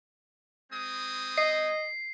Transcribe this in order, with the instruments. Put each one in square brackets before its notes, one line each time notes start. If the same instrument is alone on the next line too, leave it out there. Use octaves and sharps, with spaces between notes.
[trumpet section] G#3 C4 D#6
[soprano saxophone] D#5 [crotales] C7